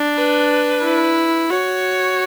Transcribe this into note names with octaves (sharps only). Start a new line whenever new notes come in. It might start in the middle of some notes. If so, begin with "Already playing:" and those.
Already playing: D4
B4
E4
F#4 C#5